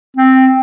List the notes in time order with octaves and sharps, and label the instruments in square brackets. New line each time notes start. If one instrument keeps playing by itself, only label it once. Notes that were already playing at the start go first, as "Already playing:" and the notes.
[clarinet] C4